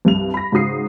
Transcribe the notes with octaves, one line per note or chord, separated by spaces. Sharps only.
C2 G2 F7
B5 A#6
G#2 C#3 F#4 D#6 C7